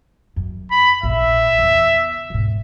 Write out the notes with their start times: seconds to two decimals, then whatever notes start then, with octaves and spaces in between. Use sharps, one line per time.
0.36 F#2
0.71 B5
1.03 A#1 E5
1.58 E2 C#3
2.30 E1 G#2